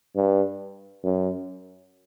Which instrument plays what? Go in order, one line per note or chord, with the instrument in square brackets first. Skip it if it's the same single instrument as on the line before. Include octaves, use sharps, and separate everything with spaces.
[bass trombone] G2
F#2